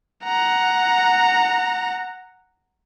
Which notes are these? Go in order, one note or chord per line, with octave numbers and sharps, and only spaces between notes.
F#5 A#5